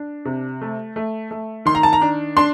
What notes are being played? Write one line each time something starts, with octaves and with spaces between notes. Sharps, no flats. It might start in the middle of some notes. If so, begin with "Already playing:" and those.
Already playing: D4
C3
A3
A3
A3
D#3 C6
A#5
A5
A#5
D4
D4 C6